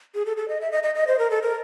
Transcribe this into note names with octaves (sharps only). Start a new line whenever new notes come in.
G#4
A4
A4
D#5
E5
D#5
D#5
D#5
C5
A#4
A4
A#4